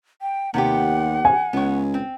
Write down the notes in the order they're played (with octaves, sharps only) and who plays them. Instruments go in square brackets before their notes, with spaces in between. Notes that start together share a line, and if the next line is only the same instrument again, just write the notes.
[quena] G5
[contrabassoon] D#2 [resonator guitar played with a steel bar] C3 B3 G4 [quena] F#5
[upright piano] G#5
[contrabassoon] C#2 [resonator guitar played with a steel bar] B3 C#5
[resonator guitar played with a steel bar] C4